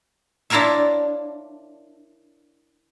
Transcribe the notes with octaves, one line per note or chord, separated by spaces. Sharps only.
D4 E4 F4 A#4 C#5 E5